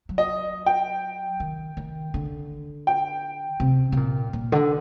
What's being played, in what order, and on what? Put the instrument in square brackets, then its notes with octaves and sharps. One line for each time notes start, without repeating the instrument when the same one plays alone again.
[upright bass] F#3
[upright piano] D#5
G5
[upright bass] D#3
D#3
D3
[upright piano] G5
[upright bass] C3
C3
A#2
A#2
D3